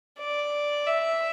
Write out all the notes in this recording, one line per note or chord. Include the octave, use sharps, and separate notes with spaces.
D5
E5